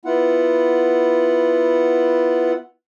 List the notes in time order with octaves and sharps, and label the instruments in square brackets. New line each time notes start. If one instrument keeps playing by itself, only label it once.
[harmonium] B3 E4 F4 F#5